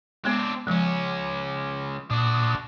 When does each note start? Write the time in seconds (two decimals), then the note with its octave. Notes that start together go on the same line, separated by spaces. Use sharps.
0.25 G#3 B3 C4 D4
0.67 C#2 F3 G#3 C#4
2.11 A#2 D4 F#4 D#6